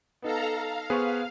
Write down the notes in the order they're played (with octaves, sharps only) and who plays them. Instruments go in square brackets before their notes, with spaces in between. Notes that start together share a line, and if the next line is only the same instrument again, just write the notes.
[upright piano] B3 D#4 [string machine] A4 F5 A#5
[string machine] F5
[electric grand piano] B3 G#4 B4 [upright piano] C5 C#6